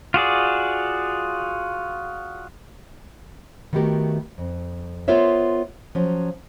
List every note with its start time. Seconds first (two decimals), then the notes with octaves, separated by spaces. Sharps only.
0.14 F4 F#4 G#4 D5
3.73 D#3 A3 B3 F#4 G4 A#4
4.38 F2
5.08 B3 F4 A#4 C5 C#5 E5
5.95 F3 F#3 C#4